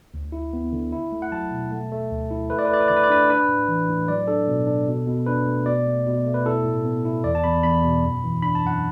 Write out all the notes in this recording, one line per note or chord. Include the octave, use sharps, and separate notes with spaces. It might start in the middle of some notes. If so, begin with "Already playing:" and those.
D2
E4
B3
D3
E4
A3
F#5
F#3 A5
B2
A3
A3
D2
E4
A3 B4
D5
B4
A3 D5
B4
D3 D5
B4
D5
D4 B4
D4 B4
A2
E3
A2
F#3 D5
D4 A4
B2
D4
B2
B2
D4 B4
A3
B2 D5
A3
B2
A3
B4
E4 A4
A2
B3
E4
E2 D5
A5
E2 B5
E2 B5
B2
F#2
E3
D4 B5
A5
F#2 F#5